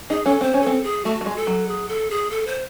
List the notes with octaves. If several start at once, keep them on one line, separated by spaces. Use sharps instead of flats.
D#4 G#4
C#4 A4
C4 C5
C#4
C4 A4
G#4
A3 F#4
A3
G#3
A4
F#3
G#4
A4
G#4
A4
C5